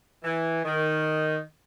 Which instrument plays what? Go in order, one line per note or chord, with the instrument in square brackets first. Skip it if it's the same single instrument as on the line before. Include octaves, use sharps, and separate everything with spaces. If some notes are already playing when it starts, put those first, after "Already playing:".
[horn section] E3
D#3